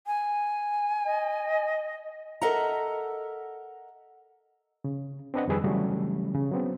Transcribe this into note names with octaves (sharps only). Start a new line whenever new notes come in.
G#5
D#5
A4 A#4 D#5 E5 F#5 A#5
C#3
C4 D4 B4 D#5 F#5
F2 D#3 G3 G#4 B4 E6
C#3 E3 F#3 G3 A3 C#4
C#3
F#3 B3 C4